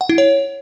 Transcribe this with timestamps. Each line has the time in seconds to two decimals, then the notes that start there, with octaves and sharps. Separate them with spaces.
0.01 F#5
0.09 E4
0.18 C#5